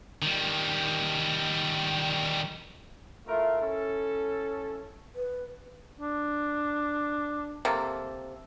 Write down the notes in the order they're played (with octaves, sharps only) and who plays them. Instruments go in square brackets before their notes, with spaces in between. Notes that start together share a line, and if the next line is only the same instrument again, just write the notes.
[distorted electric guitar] D#3 G3
[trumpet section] A3 F4 A#4 [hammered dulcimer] E4
[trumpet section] C#4 A4
[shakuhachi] B4
[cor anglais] D4
[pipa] C3 A#3 A4